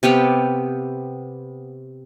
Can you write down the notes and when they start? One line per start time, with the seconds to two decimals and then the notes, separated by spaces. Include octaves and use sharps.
0.03 C3 B3 G4 F5